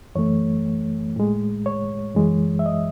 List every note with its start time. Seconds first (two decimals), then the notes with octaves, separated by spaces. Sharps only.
0.15 F#2 E3 A3 C#5
1.16 A2 G#3
1.66 C#5
2.15 F#2 E3 G#3
2.59 E5
2.66 D#5